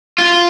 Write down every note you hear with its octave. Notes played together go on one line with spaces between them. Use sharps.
F4